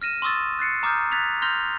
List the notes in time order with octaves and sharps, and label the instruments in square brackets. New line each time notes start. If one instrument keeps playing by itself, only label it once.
[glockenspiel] F6 A#6 D#7 E7
C6 C#6 D#6 E6 A6
F#6 A6 C7 C#7
A#5 D6 D#6 F6 G6
F#6 G#6 A6 B6 F7
C6 F6 G6 A#6 F7 G7